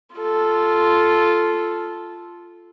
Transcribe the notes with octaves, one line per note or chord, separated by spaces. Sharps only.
F4 A4